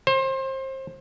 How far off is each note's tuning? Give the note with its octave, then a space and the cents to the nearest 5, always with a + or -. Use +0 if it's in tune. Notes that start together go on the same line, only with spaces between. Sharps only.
C5 +30